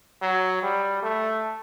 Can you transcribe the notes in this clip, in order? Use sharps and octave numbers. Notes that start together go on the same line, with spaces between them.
F#3
G3
A3